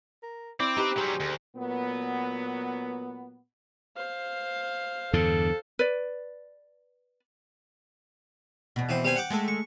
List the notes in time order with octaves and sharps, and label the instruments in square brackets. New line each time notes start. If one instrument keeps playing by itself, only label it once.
[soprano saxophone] A#4
[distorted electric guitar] C4 [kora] E4 [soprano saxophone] D6
[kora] D#4 G4 B4
[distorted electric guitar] F#3 G3 [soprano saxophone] G#4 [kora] C5
[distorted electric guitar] D2
[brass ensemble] A#2 F#3 B3
[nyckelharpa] C5 F5
[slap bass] E2 G2 D3 [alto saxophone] A4
[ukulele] B4 D5
[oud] E2 B2
[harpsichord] E3 C4
G3 C4 G#5
F#5 G5 D6
[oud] G#3 A3 A4
[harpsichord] C#6